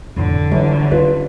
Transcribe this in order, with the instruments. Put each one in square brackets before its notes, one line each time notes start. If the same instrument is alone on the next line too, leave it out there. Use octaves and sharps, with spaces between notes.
[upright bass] F2 A2 [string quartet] D3
[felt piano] G1 E3 [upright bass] F#3 B3
[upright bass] C#4 [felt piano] F4 B4